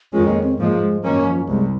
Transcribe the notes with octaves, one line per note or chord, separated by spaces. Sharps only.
F2 D#3 G#3 C#4 F4
A#3
C4
G#2 F3 G#3 A#3
G#3
F#2 D#3 F#3 A#3 C#4
F3
C2 G#3